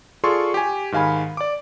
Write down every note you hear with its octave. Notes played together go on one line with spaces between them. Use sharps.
F4 G#4 A4 D5 C6 C#6
G4 G#5
G#2 D#3 F5 G#5 B5
D5 D6